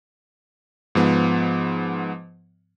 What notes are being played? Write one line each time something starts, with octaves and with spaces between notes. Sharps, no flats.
G#2 F3 B3